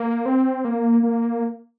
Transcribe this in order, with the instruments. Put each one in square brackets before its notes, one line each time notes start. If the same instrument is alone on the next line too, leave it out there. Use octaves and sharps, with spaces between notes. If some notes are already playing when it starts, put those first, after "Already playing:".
Already playing: [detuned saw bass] A#3
C4
A#3
A#3